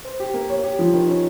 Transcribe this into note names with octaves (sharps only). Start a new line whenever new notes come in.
C5
G4
A#3
C#5
G4
F3
D#3
C#4